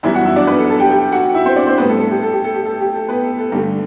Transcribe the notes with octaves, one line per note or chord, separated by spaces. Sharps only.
F#2 E3 G3 B3 E4 E5
F#4 F#5
E4 E5
D4 D5
B3 B4
A4
A4
G4 G5
G4 G5
F#4 F#5
E4 E5
C4 C5
D4 D5
C4 C5
A2 G3 B3 B4
A4
A4
G4
A4
G4
A4
G4
A4
G4
A4
B3 B4
A4
A4
G2 D3 A3 G4